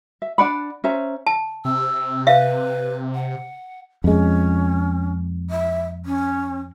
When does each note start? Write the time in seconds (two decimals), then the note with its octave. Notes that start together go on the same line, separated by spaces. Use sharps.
0.22 E5
0.38 D4 D5 F#5 B5
0.84 C#4 C5 E5 A#5
1.27 A5
1.65 C3 E6
2.27 B4 E5 F5
3.14 F#5
4.04 F2 G#3 C#4
5.50 E5
6.06 C#4